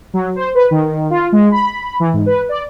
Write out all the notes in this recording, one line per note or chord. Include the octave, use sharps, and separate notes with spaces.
F#3
C5
B4
D#3
F4
G#3
B5
E3
G#2
B4
D5